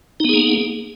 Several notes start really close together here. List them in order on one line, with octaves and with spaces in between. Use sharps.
D#4 B3 G#4 A#3